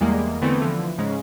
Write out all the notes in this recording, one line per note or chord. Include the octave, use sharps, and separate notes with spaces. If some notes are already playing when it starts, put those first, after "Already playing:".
E2 G3 G#3 A#3
D3 E3 A3 B3 C4
D3 E3 F3
G#2 C#3 G#3